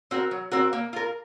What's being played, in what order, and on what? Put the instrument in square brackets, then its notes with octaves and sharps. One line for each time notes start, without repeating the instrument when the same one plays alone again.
[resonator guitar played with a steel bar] C4 F#4 A#4
F#3
C4 F#4 A#4
A#3
F4 A#4